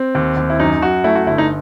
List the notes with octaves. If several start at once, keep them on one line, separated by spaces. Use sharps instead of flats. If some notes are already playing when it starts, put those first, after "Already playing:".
Already playing: C4
D#2
D#2
E4
F#2 D#4
F#2 F#4
A3 E4
F#4
G1 E4
D#4